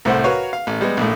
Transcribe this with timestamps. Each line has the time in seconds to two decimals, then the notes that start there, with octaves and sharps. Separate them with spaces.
0.05 C2 A2 A3 C5 F#5
0.24 F#4 A#4 B4 C#5 F5
0.53 F5
0.67 A1
0.81 G3 G#3 B3
0.97 A#1 A2